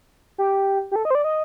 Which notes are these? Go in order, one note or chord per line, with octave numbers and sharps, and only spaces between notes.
G4
G4
A4
D#5
C5
D5
D#5